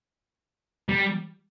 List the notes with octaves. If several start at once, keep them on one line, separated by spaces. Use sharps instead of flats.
G3